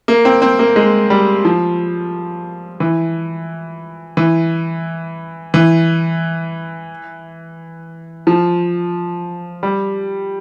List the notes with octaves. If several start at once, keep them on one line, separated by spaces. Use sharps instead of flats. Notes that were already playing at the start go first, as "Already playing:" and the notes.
A#3
C4
C4
A#3
G#3
G3
F3
E3
E3
E3
F3
G3